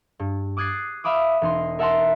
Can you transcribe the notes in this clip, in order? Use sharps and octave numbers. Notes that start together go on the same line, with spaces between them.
G2
D6 D#6 F#6 G#6 A6 C7
E5 F5 B5 D6 D#6
E1 D#4 C6
A#4 E5 F#5 A5 A#5 C6